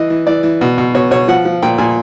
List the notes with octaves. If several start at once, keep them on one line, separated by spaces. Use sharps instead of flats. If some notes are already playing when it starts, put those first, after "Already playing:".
Already playing: E3 D#5
E3
E3 D5
E3
B2
B2
B2 C#5
B2 C#5
F3 F#5
F3
A#2 G5
A#2 G#5